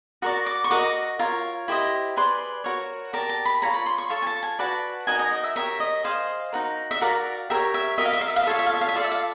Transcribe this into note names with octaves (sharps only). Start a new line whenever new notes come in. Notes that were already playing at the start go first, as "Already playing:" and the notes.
F#4 A#4 D5 C#6
D6
C#6
F#4 A#4 D#5 D6
F4 A#4 C#5
E4 G4 C5 D#5
G#4 B4 D5 C6
F#4 A#4 C#5
G4 A#4 D5 A5
A5
B5
F4 G#4 C#5 A#5
B5
C6
C#6
F4 A4 C#5 C#6
G#5
A5
G#5
F#4 B4 D5 A5
D#4 F#4 A#4 D#5 G#5
D#5
D#5
E5
G4 A#4 C#5 E5
D#5
G#4 C5 D#5 F5
D#4 F#4 A#4
E5
F#4 A#4 D5 F5
G4 A#4 C#5 E5
E5
F#4 A#4 D#5 E5
F5
E5
F5
E5
F5
E5
F4 A4 C#5 F5
E5
F5
E5
F5
E5
F4 A4 D5 F5
E5
F5